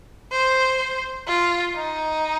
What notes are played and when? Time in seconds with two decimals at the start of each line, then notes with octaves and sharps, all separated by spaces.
0.31 C5
1.27 F4
1.75 D#4